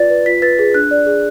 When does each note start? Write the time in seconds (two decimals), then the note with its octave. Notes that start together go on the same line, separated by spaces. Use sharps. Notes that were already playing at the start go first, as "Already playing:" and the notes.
Already playing: F4 B4 D5 A6
0.10 B4
0.26 F4 B6
0.42 B4 A6
0.59 G#4
0.74 D4 F#6
0.91 D5
1.06 G#4